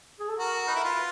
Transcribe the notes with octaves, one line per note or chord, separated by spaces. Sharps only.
G#4
A4
F#4 A#4
D#4 B4
E4
F4